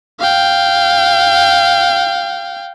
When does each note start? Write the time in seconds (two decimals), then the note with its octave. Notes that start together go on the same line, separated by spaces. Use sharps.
0.20 F5 G5